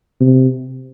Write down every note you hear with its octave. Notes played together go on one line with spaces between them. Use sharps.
C3